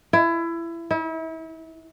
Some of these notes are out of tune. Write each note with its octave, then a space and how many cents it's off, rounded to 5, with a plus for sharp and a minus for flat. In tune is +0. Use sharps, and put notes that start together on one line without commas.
E4 +25
E4 -35